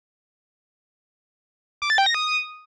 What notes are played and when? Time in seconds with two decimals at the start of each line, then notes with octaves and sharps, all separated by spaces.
1.82 D6
1.90 A6
1.98 G5
2.06 A#6
2.14 D#6